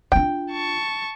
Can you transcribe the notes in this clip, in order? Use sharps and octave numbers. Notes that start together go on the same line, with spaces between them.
D4 F4 G5
A5 C#6